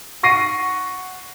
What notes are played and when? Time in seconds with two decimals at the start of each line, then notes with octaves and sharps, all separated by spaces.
0.23 F#5 C#6 A#6 C7 D#7